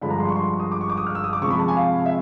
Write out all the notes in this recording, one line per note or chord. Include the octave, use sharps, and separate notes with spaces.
G2 D3 F3 G#3 B5
A#5
C6
C#6
C6
D#6
D6
C#6
D6
D#6
F6
E6
D#6
D6
C3 F3 G#3 C#6
B5
A5
G#5
F5
E5